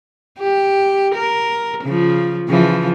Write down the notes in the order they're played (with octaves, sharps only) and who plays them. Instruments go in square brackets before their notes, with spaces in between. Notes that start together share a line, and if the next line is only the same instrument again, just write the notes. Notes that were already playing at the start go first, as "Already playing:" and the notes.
[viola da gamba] G4
A#4
C#3 F3
C#3 E3 F3